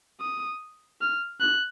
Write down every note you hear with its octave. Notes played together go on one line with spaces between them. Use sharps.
D#6
F6
F#6